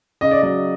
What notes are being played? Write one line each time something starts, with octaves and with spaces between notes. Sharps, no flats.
C#3 D#5
D5
F#3 D#5